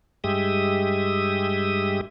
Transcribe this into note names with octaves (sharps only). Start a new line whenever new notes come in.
G2 G#3 G4 E5 D#6